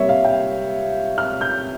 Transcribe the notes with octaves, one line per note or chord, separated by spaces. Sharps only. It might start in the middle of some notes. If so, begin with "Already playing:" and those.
Already playing: C3 G3 A#3 C#5 E5
F5
G5
F6
G6